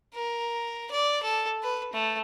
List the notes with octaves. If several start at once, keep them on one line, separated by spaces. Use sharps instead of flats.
A#4
D5
A4
B4
A3